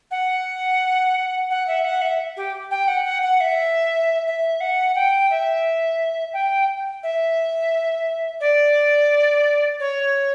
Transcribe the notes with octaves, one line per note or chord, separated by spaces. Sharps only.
F#5
F#5
E5
F#5
E5
G4
G5
F#5
F#5
F#5
E5
E5
F#5
G5
E5
G5
E5
D5
C#5